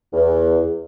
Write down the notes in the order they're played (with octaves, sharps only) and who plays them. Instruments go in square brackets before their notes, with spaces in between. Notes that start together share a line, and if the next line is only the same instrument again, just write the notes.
[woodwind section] E2